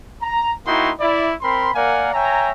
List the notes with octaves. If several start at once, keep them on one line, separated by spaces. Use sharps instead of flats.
A#5
A#3 D#4 E4 F#4 G5 C6
E4 D5
C4 A#4 B5 C6
A#3 A#4 D5 F5 F#5 G#5
C#5 E5 G5 G#5 A#5